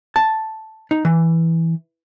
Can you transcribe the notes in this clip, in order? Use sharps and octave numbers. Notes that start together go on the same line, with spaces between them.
A5
D#4
E3